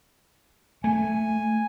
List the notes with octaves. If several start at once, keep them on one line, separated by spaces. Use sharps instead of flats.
A3 G#5